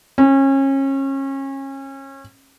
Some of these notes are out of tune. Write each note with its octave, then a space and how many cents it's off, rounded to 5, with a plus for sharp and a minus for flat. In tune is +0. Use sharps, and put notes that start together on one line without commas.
C#4 -30